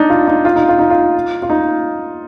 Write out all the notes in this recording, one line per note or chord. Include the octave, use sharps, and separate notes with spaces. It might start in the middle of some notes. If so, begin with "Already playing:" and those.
Already playing: D4 D#4
F4
D#4
F4
D#4
F4
D#4
F4
F4
D#4